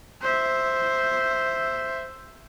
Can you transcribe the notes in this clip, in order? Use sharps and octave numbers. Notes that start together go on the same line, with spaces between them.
C5 E5